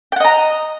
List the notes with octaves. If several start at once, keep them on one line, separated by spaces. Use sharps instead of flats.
D#5 F#5 G5 A#5